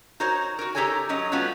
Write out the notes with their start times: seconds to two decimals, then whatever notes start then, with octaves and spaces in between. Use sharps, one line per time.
0.20 D#4 F#4 A#4 C5 C#5
0.59 F#4 A#4
0.75 D#4 G4 A4 A#4 C#5 G#5
1.09 F#3 C#4 D#5
1.32 G3 A3 B3 C#4 F4 F#4